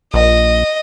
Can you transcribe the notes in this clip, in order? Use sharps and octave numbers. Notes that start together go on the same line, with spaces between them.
A#1 D#5